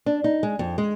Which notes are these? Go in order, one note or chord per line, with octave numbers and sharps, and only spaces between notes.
D4
D#4
G#3
F2
G#3